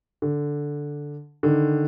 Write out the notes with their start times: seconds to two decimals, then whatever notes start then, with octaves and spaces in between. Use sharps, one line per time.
0.22 D3
1.43 D3 D#3